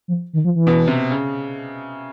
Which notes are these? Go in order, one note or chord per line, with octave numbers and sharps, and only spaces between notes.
F3
D#3
F3
E3
B2
C3
C#3